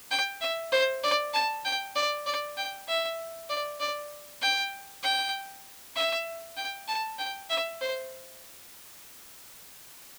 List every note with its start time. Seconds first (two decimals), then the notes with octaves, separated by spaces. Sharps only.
0.11 G5
0.41 E5
0.72 C5
1.03 D5
1.33 A5
1.65 G5
1.95 D5
2.26 D5
2.57 G5
2.87 E5
3.49 D5
3.80 D5
4.42 G5
5.03 G5
5.95 E5
6.57 G5
6.88 A5
7.18 G5
7.49 E5
7.81 C5